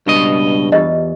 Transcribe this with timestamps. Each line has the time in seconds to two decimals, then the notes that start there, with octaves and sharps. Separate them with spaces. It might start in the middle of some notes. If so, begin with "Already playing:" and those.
0.07 C#2 G2 B2 D#5
0.72 E2 F4 G4 D#5